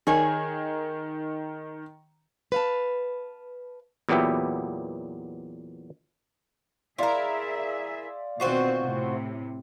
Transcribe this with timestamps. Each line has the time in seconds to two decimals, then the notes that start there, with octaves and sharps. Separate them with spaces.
0.07 D#3 G#4 C#5
2.52 B4 F5 A5
4.09 E2 A#2 F#3 B3 G4 E5
6.98 E4 G#4 A#4 D5 E5 F5 C6
8.40 B2 D#3 C4 F4 F#4 C5
8.81 A2 C3